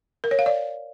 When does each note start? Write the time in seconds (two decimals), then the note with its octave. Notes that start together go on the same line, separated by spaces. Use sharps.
0.24 A#4
0.31 C#5
0.39 F5
0.46 D5